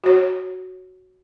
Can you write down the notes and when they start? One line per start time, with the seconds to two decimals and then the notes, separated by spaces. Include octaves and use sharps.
0.04 F#4 C#5